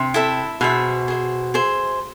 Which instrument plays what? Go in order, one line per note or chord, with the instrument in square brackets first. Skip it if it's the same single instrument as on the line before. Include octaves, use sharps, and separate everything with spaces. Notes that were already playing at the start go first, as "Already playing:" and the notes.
Already playing: [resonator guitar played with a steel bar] C3
[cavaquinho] E4 A4 E5 B5
[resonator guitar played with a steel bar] B2 [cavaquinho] G#4 C5 E5
[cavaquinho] G#4 C5 E5
G#4 C5 E5